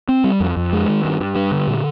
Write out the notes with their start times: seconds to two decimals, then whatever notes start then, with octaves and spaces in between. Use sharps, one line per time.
0.09 C4
0.24 G3
0.40 F2
0.57 F2
0.73 G#3
0.88 D#3
1.05 G2
1.20 G2
1.35 G3
1.52 D3
1.68 A#2